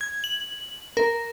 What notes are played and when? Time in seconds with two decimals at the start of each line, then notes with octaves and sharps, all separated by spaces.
0.01 G#6
0.24 F#7
0.97 A#4